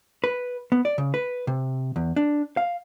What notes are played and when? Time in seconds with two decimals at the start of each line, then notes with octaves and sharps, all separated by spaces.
0.24 B4
0.72 B3
0.85 D5
0.98 C#3
1.14 B4
1.47 C3
1.96 E2
2.16 D4
2.57 F5